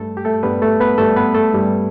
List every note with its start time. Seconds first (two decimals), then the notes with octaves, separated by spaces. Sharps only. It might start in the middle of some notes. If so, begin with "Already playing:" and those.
Already playing: G2 G3 A3 A4
0.17 G4
0.25 A3 A4
0.43 G2 G3 B3 B4
0.62 A3 A4
0.80 B3 B4
0.98 G2 G3 A3 A4
1.16 B3 B4
1.35 A3 A4
1.53 G2 G3 E4